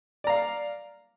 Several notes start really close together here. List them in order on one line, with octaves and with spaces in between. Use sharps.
D5 A#5 F5